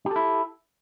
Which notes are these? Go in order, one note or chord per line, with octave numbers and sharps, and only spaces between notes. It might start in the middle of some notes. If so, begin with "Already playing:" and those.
E4 G4 A4